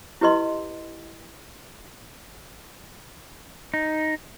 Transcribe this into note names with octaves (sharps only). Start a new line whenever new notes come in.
E4 G4 B4 D#5 C6
D#4